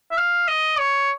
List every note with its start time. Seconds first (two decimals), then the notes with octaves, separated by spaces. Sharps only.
0.11 E5
0.18 F5
0.48 D#5
0.79 C#5